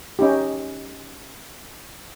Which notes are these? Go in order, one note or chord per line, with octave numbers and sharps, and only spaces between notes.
C#4 D#4 G4